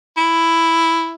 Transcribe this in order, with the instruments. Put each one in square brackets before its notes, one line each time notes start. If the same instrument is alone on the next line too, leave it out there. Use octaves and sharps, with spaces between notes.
[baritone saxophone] E4